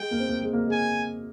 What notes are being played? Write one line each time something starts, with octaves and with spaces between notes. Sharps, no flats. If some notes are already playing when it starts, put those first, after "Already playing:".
Already playing: G#3 G5
A#3
C4
A#3
G#3
A#3
G#3
G#5